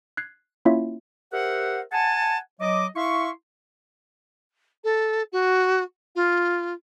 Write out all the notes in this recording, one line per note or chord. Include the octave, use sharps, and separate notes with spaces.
F#6 G#6 C7
A#3 C#4 E4 F4 C#5 E5
G4 A#4 C5 E5 F#5
F#5 G#5 A5
F#3 D#5 D6
E4 E5 F5 C6 C#6
A4
F#4
F4